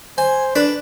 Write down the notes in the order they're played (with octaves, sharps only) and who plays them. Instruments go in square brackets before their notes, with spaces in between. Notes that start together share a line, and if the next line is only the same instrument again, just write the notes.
[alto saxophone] C5 [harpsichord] G#5
[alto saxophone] D4 [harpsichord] B4